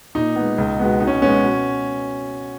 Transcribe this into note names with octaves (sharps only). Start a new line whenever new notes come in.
A#2 D#4
G#3 B3
C#2
B2 G#3 B3
B2 D#4
C#4
G#3 B3 C#4
B2